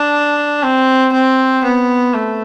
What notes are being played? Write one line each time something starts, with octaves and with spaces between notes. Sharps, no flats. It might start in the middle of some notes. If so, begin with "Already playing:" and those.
Already playing: D4
C4
C4
B3
A3